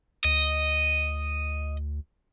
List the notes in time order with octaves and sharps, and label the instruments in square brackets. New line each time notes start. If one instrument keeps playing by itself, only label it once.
[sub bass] D2 [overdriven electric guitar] D#5